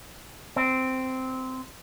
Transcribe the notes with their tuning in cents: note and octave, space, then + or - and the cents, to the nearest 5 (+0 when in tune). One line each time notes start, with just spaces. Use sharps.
C4 -10